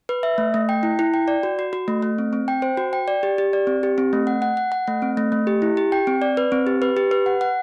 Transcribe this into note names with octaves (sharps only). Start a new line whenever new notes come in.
B4
E5
A3
A3
G5
E4
E4
G5
D5
F#4
F#4
F#4
A3
A3
C4
C4
G5
C5
F#4
G5
D5
G4
G4
D5
C4
G4
C4
A3
F#5
F#5
F#5
F#5
A3
C4
A3
A3
G4
E4
G4
G5
C4
D5
B4
C4
G4
B4
G4
B4
F#5
F#5